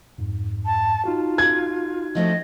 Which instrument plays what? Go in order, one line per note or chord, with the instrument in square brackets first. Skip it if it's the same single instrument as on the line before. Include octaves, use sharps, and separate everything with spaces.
[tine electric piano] F2 G#2
[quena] A5
[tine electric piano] D#4 F#4 [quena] F4
[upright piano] G#6
[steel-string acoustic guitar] F3 A3 C4 [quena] D#5